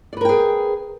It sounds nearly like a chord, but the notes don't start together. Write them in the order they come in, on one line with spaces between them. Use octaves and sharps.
D5 B4 A#4 G5 G#4